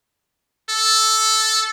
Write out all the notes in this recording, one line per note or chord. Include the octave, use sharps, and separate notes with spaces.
A4